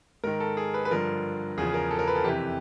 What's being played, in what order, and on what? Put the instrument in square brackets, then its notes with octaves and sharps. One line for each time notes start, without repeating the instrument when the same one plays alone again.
[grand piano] G#2 D#3 A#4
A4
G#4
B4
B4
G2 D3 F3 A#4
E2 C#3 F3 G#4
A#4
A4
A#4
B4
A4
F2 C3 E3 G4